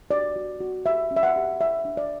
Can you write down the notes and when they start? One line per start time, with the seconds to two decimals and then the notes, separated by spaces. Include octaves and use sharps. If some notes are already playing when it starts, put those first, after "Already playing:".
0.11 F#4 D5
0.36 F#4
0.60 F#4
0.86 G4 E5
1.11 C#4
1.16 E5
1.23 F#5
1.36 G4
1.61 C#5 E5
1.85 D4
1.97 D5